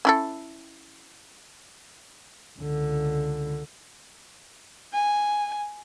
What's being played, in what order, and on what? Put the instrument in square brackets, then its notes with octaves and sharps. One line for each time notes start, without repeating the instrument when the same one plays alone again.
[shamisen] C#4 E4 A4
[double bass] C#2 D3
[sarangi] G#5